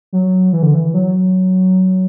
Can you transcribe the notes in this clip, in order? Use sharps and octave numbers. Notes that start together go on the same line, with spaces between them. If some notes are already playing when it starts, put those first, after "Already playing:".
F#3
E3
D3
E3
F#3